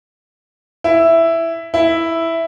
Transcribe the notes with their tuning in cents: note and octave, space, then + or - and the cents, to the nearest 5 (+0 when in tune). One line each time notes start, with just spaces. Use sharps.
E4 +5
E4 +0